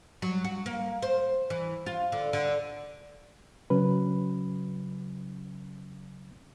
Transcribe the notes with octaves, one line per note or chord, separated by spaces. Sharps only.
F#3
F#4
A#3
C5
E3
F4
D3
D3
C#3 F#3 C#4 B4